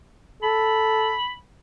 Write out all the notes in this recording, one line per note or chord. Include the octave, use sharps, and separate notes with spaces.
A4 B5